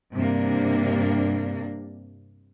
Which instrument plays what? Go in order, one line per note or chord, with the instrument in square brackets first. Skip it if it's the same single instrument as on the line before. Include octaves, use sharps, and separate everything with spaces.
[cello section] G2 C3 A#3 D4